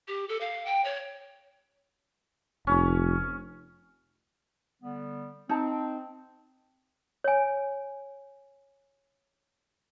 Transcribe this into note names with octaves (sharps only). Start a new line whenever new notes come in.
G4
A4
F5
G5
C#5
F1 C#4
D3 G3 B3
C4 D#4 A5
C#5 G#5